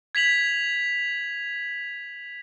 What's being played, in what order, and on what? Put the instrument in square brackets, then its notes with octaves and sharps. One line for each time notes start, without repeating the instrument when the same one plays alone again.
[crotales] G#6 B6 F7 F#7